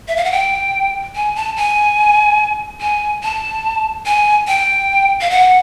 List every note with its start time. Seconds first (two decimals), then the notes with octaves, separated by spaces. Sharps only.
0.08 E5
0.17 F5
0.24 F#5
0.32 G5
1.15 G#5
1.36 A5
1.57 G#5
2.81 G#5
3.23 A5
4.06 G#5
4.47 G5
5.21 F5
5.30 F#5